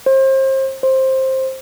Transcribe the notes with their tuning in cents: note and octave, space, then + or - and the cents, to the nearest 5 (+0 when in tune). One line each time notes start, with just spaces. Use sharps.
C5 +35
C5 +15